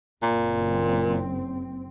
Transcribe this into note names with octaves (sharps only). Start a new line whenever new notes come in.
F#1 A#2 C4